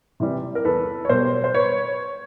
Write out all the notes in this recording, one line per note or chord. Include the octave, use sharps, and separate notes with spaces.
C3 E3 G3
A#4
E2 A4 B4
C#5
B2 G3 A#4 C5
C5
B4 C#5